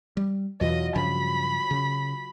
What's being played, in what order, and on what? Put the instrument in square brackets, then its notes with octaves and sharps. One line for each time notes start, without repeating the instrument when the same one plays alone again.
[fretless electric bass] G3
[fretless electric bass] E2 B2 E3 [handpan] F#3 F4 [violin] D#5
[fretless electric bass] G2 C#3 F3 [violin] B5
[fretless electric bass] C#3